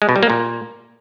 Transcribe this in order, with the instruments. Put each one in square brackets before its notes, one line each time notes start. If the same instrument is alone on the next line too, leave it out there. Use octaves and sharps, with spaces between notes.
[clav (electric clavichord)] G#3
B2
G3
A#3
A#2